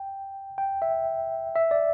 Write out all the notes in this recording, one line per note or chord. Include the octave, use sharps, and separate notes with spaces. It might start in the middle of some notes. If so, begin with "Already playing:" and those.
Already playing: G5
G5
E5
E5
D5